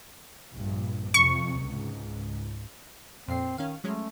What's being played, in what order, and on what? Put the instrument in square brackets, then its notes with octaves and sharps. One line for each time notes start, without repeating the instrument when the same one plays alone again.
[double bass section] A#1 G2
[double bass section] F2 C3 [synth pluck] C#6
[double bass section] C#2 G#2
[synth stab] F2 A#2 C7 [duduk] C4
[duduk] D#3 [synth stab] C#4 F5
[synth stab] F#3 G#3 C#4 [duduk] A3